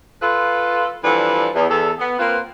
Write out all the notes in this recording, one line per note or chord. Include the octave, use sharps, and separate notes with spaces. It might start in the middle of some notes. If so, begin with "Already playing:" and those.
F4 A4 B4
E3 F3 G3 D4 A4 B4
E2
E2 A4
B3
A#3 C4 F4 B4